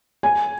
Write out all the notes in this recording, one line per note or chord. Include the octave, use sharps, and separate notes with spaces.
G#5